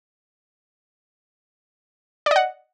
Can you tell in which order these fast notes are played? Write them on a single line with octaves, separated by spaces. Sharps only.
D5 D#5 F#5